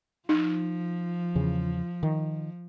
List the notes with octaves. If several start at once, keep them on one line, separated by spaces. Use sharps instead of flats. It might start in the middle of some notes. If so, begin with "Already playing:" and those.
F3 D#4
E2 C#3
D#3